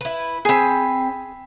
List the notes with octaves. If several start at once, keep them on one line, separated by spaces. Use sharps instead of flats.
E4 B4
C4 G#4 G#5 B5